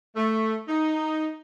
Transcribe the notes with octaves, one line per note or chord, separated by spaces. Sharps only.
A3
D#4